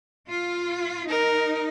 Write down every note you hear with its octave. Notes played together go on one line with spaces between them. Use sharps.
F4
D#4 A#4